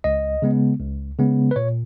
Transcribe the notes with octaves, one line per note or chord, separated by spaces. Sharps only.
C#2 D#5
C#3 G#3 B3
C#2
C#3 G#3 B3
B4
A#2 C#5